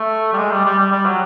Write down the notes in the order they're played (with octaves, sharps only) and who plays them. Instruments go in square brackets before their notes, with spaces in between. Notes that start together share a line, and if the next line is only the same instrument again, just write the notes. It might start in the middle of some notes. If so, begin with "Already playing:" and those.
Already playing: [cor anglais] A3
G3
G#3
G3
G3
G3
G3
F#3